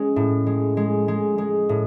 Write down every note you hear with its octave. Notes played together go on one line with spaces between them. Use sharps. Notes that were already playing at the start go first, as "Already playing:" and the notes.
Already playing: G#3 C#4
A2
G#3
G#3
G#3
G#3
A2